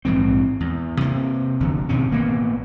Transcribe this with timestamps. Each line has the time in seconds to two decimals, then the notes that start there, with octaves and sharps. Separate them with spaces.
0.05 A#1 G#2 E3 C4
0.60 E2
1.01 C3 A#3
1.60 F1 E2 D3
1.89 B2 D#3 C4 C#4
2.11 A1 A#3 B3